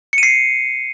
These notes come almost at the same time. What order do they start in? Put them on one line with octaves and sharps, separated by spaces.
C#7 D#7 C7